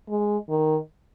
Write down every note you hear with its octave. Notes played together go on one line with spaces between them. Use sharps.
G#3
D#3